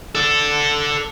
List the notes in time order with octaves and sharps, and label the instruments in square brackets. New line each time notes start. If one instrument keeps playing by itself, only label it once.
[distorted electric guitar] A4 D5